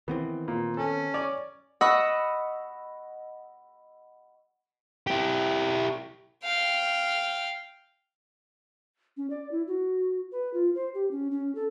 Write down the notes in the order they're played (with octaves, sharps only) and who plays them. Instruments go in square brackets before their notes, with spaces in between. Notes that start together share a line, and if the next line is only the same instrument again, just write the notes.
[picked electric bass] D#3 B3 C4 [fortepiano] E3
[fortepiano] A#2
[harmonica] C#4 [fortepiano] A4
[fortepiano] C#5 D5
[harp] D#5 F#5 B5 C#6 D#6 E6
[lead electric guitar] E4 G4
[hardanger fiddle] F5 G5
[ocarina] C#4
D5
E4
F#4
B4
F4
C5
G4
C#4
C#4
A4